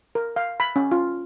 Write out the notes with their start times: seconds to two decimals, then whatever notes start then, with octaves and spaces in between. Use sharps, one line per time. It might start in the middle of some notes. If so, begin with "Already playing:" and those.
0.15 A#4
0.36 F5
0.60 B5
0.76 C#4
0.91 F4